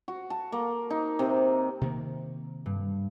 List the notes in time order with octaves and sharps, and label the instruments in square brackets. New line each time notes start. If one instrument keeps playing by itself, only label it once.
[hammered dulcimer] F#4
A5
A#3
D#4
C3
[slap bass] C3 D#3 A#3
[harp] G2